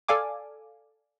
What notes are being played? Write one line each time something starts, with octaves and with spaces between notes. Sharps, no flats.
A4 D5 F5 G#5 D6